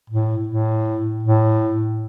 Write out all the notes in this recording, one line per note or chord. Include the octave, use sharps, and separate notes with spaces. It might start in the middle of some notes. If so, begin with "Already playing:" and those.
A2
A2
A2